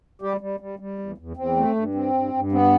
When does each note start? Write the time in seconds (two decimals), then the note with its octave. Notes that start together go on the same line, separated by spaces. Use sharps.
0.22 G3 G4
0.41 G3
0.60 G3
0.79 G3
0.99 E2
1.18 E2
1.37 E2 C4
1.56 A3
1.76 G2
1.94 C4
2.14 G2
2.33 G2
2.52 B3 C4